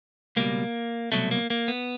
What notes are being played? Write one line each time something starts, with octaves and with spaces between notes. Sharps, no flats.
C#2 B2 G3 A#3
C2 B2 F#3 A3
A#3
A#3
B3